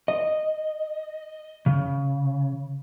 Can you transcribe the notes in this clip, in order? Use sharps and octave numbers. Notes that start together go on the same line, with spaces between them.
D#5
C#3